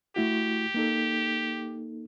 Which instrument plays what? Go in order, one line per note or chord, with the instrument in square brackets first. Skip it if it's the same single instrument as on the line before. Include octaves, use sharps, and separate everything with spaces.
[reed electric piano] A3 E4 F#4 [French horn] G4
[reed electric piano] A#3 D#4 A4